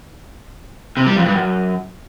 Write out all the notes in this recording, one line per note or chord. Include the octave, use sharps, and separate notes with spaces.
C3
G3
F2
G2
F#2